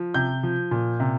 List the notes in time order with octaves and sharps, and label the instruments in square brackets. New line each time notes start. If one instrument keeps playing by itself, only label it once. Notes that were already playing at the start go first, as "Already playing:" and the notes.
Already playing: [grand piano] F3
C3 G6
F3
A#2
C3